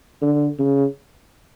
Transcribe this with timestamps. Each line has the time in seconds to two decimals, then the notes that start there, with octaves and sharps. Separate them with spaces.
0.22 D3
0.59 C#3